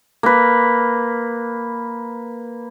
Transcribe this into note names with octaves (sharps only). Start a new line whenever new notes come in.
A#3 B4